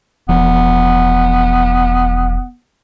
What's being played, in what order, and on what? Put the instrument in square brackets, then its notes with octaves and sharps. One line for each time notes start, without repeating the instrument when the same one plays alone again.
[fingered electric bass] E1 F3 [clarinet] B3